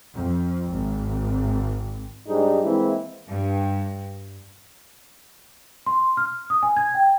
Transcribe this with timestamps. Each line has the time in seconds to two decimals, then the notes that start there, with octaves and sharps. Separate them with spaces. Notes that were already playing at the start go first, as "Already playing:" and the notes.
0.15 F2
0.72 G#1
2.28 G#2 G3 G#3 D4 D#4
2.63 E3 G#3 A#3 C4 E4
3.29 G2
5.86 C6
6.17 F6
6.50 D#6
6.63 G#5
6.77 G#6
6.94 G5